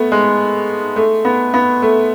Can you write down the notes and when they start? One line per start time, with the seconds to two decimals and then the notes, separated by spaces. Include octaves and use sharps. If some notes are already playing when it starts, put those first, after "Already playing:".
Already playing: A3 B3
0.12 G#3
0.96 A3
1.25 B3
1.54 B3
1.82 A3